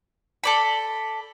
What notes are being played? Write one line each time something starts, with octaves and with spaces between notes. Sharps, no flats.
A4 D5 B5